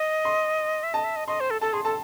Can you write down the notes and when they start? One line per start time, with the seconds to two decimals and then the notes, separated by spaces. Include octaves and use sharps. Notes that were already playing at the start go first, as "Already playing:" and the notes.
Already playing: D#5
0.25 C6
0.83 E5
0.94 D#5 A5
1.04 E5
1.16 D#5
1.28 D#5 C6
1.40 C5
1.50 A4
1.61 A4 A5
1.73 G#4 C6
1.84 A4 A5